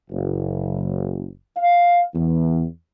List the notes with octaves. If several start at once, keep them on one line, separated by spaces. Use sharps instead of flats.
F#1
F5
E2